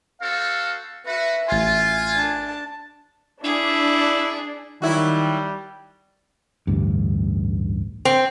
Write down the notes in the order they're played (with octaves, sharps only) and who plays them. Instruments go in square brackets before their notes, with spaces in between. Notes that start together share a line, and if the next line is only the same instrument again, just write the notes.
[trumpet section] C4 F#4 A4 [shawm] F5
[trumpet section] F#4 [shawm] B4 [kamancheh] E5
[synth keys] A1 C6 [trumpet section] F4 [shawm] G#5
[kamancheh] D4 A5
[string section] D4 [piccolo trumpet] E4 [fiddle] G#4
[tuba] D#3 [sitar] F#3 E4 F#4 [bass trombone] G3
[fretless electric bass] A1 D2 G2
[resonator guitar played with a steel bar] C4